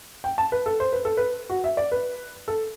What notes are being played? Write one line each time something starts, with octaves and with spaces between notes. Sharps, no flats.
G5
A5
B4
A4
C5
B4
A4
B4
F#4
E5
D5
B4
A4